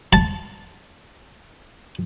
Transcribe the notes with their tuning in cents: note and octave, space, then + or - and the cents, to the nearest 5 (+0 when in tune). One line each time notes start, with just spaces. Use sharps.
A5 -5